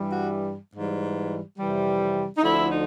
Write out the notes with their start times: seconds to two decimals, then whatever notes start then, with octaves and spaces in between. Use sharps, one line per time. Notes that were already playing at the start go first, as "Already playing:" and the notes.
Already playing: G2 E3 G3
0.11 F#4
0.74 G#2 E3 G3
1.59 F2 C3 E3 G3
2.37 D#4
2.42 D2 D3 F3 E4
2.70 D#4